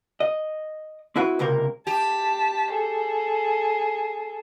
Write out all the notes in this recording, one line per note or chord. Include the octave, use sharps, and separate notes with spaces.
D#5
C4 E4 F#4 B4
C#2 C3 A#3 A#4
G4 A5 B6
G#4 A4